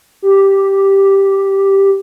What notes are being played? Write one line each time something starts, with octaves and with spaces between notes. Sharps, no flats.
G4